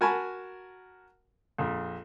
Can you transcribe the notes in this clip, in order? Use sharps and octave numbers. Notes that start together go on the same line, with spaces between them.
F#4 A#4 G#5 A5 B5 C#6
A#1 F2